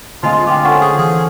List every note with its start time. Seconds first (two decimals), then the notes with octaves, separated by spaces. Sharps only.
0.23 D3 F3 G#3 A3 C4 F4
0.47 F4 G5 D6
0.65 C#4 A4 C5 F#5 C#6
0.82 G#4
0.99 E3 G#4